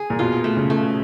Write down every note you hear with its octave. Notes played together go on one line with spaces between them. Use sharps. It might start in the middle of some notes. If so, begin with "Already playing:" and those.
Already playing: G#4
A#2
B2 F4
A3
C#3
A3